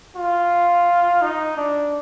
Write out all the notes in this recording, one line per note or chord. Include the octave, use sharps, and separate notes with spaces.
F4
D#4
D4